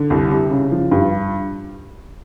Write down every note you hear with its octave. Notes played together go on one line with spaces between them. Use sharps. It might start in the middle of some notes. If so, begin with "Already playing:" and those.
Already playing: D3
C2
C3
C#3
F3
G2